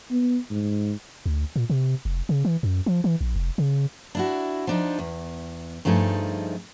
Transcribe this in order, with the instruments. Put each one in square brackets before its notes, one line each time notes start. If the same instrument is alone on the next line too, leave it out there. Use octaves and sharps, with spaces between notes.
[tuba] B3
G#2
[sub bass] D2
A#2
C3
F1
C#3
E3
F#2
F3
E3
A#1
F1
C#3
[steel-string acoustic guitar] D4 E4 F#4
F3 D4 D#4
E2
G2 F3 A3 D#4 G#4